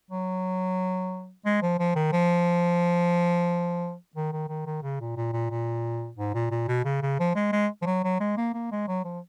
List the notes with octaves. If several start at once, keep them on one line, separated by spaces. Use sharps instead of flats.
F#3
G#3
F3
F3
D#3
F3
D#3
D#3
D#3
D#3
C#3
A#2
A#2
A#2
A#2
G#2
A#2
A#2
B2
C#3
C#3
F3
G#3
G#3
F3
F#3
F#3
G#3
A#3
A#3
G#3
F#3
F3